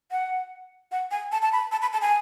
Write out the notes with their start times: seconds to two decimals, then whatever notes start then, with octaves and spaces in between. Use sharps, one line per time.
0.11 F#5
0.92 F#5
1.11 G#5
1.32 A5
1.42 A5
1.52 B5
1.72 A5
1.82 B5
1.93 A5
2.02 G#5